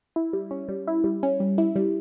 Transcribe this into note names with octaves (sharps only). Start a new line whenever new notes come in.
E4
G3
C#4
G3
E4
G3
C#4
G3
E4
G3